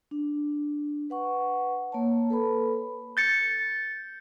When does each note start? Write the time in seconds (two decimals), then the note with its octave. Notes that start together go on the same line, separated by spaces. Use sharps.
0.11 D4
1.10 B4 F#5 C#6
1.92 A#3 C#5 A5
2.30 A4 B4 B5
3.17 G6 A6 C#7